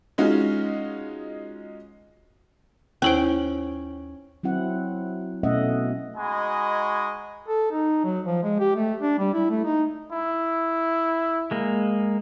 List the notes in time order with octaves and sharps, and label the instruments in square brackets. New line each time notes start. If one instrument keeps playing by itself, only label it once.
[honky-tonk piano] G#3 C#4 D#4 F4 F#4
[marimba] D#2 E4 C5 [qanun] C#4 G5 [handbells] C#5
[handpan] F#3 C4 E4 F#5
B2 A3 C#4 D#5 E5 F#5
[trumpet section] G#3 D#4 F#4 D#5 G#5 B5
[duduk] A4
D#4
F#3
F3
G#3
G4
A3
D4
G3
E4
A3
D#4
[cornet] E4
[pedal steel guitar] G#3 A#3